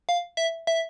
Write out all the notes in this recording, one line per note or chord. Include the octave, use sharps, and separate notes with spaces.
F5
E5
E5